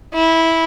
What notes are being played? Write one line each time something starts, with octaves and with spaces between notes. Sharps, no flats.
E4